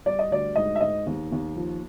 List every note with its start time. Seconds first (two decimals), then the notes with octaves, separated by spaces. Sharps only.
0.06 G3 D5
0.19 D#5
0.31 D2 D5
0.56 G#2 D#5
0.76 E5
0.81 G#2 D#5
1.06 D#2
1.32 D#2
1.56 F3